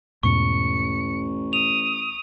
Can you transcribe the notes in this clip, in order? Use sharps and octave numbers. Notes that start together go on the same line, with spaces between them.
A1 E2 G#2 B2 C#6 C#7
D#6 F7